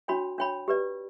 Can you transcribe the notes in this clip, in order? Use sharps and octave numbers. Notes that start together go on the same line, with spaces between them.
D4 F#4 C#5 G5 B5
D4 F#4 C#5 G5 B5
G4 B4 D5